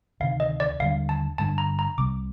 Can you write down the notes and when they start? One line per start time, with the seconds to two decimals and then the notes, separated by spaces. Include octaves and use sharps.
0.20 D2 C3 D#3 F5
0.40 D#5
0.60 D5
0.80 D#2 D3 G3 F5
1.09 A5
1.38 G2 D3 G3 D4 A5
1.58 A#5
1.79 A#5
1.97 C2 C3 G3 D6